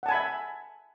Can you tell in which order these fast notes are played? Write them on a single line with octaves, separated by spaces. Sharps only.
F#5 A5 G#5 B5 E5